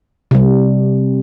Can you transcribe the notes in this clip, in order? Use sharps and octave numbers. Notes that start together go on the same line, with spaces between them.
C3 G3